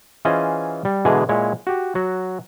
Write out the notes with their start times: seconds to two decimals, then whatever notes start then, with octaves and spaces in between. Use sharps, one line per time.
0.25 E3 C#4 F4 G#4 C5 D#5
0.85 G3
1.05 B2 D3 E3 G#3 G#4
1.29 A#2 G#3 E4 C#5
1.67 F#4 G4
1.95 F#3 F#4